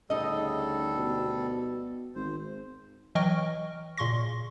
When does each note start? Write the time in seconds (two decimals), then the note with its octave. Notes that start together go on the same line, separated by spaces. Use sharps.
0.10 D2 C#3 G3 D#4 A4 D#5
0.96 B2
2.15 G#1 C5
3.15 E3 F#3 D#5 G5 C#6 F6
3.97 A#2 C#3 C6 C#6 A#6